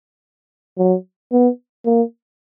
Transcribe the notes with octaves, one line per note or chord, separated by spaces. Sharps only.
F#3
B3
A#3